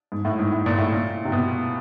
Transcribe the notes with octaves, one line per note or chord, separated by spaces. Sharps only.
G#2
A2
G#2
A2
A#2
A2
A#2
C3
B2